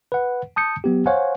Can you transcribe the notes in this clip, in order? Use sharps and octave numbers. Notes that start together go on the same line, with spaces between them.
B4 F#5
A5 D#6 G6 C#7
F#3 B3 G4
C5 C#5 F5 F#5 G#5